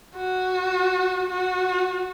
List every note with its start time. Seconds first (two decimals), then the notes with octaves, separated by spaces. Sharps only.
0.16 F#4
1.30 F#4